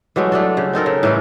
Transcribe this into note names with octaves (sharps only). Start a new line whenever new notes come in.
E3 F#3 G#3 A3
A3 D4 A4
C#3
C4 D#4 A4 A#4
C#3
A2 E3 A3